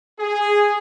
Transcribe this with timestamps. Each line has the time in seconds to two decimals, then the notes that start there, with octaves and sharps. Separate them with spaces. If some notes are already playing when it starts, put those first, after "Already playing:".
0.20 G#4